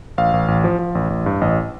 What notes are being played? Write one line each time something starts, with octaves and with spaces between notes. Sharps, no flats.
A1 F5
A1
A1
F3
F3
A1
A1
G2
A1 D#5